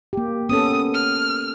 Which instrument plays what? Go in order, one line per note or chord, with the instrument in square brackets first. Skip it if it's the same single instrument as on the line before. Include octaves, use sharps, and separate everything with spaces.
[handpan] A#3 G4
[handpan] B3 C#4 A4 [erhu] D#6
[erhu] F6